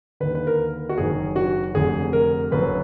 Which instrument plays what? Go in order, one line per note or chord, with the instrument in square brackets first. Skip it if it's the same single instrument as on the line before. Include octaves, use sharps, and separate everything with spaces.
[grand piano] D#2 D3 B4
B4
A#4
F#4
F#1 F#2 D#3 G#4
F#4
F1 F2 D3 G#4
A#4
F#1 F#2 D3 B4